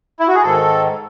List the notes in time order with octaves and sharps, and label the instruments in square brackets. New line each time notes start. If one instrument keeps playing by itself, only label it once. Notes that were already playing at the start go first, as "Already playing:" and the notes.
[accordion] E4
F#4
G#4
G#2 D#3 A4